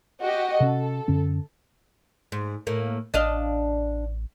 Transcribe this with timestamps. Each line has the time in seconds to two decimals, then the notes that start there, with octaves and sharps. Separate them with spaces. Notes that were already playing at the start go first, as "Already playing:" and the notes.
0.20 F#4 G4 D#5
0.60 C3 C#4 A4
1.08 F#2 D3 C#4
2.32 G#2
2.67 A2 A#3
3.14 A1 D4 D#5 F5